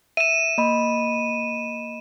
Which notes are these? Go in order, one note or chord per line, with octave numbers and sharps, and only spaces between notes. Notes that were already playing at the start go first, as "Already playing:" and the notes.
E5 D#7 E7
A#3 D#5 B5